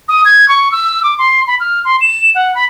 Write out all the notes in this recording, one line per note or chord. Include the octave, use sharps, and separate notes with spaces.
D#6
G#6
C#6
E6
D6
C6
B5
F6
C6
E7
F#5
B5